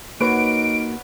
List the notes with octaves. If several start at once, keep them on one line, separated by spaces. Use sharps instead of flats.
A#3 D#4 F#4 B4 C#5 F#5 D7